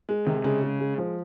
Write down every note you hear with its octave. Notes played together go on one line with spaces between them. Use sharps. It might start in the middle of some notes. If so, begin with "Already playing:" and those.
G#3
C3 D#3
C#3 G#3
G#3
G#3
F3